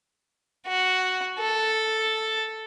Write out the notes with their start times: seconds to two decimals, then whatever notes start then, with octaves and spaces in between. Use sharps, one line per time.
0.67 F#4
1.39 A4